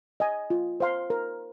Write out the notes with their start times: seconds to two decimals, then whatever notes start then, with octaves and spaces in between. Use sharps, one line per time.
0.20 D#5 G#5
0.50 F4
0.80 C5 F5 C6
1.10 A#4